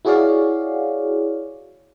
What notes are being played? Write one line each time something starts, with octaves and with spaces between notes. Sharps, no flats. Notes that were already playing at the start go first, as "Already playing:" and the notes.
E4 F#4 G#4 C#5 D5 F5